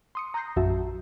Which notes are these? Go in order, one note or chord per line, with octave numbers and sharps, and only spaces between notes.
C6 D#6 C#7
A#5 D#6 F#6 G6 A#6 C7
A#1 F#2 F#4 E5 A5